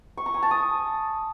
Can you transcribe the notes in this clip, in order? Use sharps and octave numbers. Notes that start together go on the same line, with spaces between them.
C#6
A#5
G#5
A5
D#6